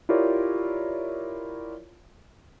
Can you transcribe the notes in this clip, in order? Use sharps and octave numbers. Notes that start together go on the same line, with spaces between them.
E4 F4 G4 A#4 C#5 D5